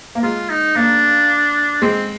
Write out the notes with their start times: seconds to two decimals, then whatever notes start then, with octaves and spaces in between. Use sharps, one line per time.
0.15 A#3
0.23 G#3 F4
0.50 D#4
0.76 A#3 D4
1.82 G#3 C4